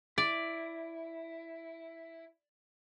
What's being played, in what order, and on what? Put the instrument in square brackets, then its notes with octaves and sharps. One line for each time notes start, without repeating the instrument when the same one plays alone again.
[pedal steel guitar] E4 [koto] D5